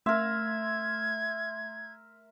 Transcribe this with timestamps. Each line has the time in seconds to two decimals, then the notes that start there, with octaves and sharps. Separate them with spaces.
0.06 A3 A#4 E5 C6 G#6